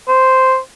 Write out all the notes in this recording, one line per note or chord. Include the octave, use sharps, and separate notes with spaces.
C5